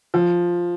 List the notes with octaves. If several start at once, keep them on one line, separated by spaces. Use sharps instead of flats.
F3